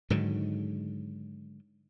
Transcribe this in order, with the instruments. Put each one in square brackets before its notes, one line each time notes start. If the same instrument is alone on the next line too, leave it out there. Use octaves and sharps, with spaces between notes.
[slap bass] G#2 D3 D#3 F#3